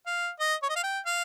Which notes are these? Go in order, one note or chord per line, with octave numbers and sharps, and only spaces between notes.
F5
D#5
C#5
D#5
F5
G5
F5